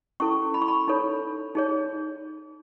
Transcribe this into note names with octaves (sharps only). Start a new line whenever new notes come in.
C#4 E4 A4 C#6
B5
C#6
B5
D#4 A4 C#5
D#4 G#4 C#5